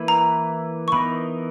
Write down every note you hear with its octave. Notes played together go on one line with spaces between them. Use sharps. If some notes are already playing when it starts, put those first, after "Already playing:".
Already playing: E3 A#3 E4 B4
A#5
C#6
E3 B3 D#4 A#4 B5